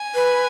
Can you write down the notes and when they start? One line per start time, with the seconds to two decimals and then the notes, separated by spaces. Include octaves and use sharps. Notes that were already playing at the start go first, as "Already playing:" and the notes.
Already playing: G#5
0.15 B4